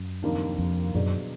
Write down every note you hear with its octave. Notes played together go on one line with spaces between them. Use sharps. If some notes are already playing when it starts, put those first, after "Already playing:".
Already playing: F#2
F1 D#2 D#3 A#3 D4
F2
F#2 B2 F#3 D4 G#4 D5